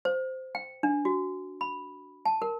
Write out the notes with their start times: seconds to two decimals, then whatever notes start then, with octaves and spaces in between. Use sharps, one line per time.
0.05 C5
0.55 G5
0.83 D4
1.05 F#4
1.61 B5
2.25 A5
2.42 A#4